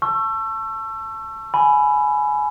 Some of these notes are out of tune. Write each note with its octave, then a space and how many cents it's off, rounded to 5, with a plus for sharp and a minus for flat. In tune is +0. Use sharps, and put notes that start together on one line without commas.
A5 +0 C#6 -15 E6 +30
G#5 +20 B5 +0